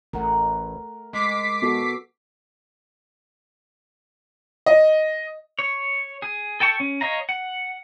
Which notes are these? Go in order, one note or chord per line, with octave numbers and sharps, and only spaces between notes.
A1 A3 A#4 F#5
G#3 D6 B6 C7
B3 F#4 A4
D#5
C#5
G#4
A4 G5 A5 C#6
C#4
C#5 D#5 F5 A#5
F#5